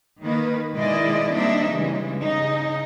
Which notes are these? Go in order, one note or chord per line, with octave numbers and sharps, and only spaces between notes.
D#3 A#3 B4
B2 D#3 G#3 E4 D5 D#5
G3 A#3 C4 D4 D#4 E5
C#3 E3 G3 G#3
C#3 D#4